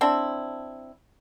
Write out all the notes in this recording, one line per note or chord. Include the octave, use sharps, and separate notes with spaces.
C4 D4 E4